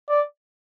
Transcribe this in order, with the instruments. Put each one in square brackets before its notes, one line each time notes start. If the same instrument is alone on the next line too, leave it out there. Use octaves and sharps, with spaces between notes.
[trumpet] D5